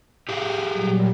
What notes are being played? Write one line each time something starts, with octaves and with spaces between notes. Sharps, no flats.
G4 G#4 F5 F6
A#2 F#3 G3